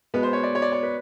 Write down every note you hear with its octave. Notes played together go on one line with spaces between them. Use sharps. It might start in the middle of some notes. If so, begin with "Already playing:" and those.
B2 G#3 B3 B4
C5
C#5
D5
C#5
D5
C#5
B4